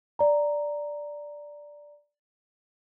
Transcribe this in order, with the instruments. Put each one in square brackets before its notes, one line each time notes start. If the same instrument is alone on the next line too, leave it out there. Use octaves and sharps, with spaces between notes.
[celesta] D5 A#5